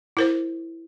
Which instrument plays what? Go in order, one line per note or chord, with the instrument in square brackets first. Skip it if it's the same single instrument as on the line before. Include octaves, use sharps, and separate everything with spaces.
[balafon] E4 A#4 C5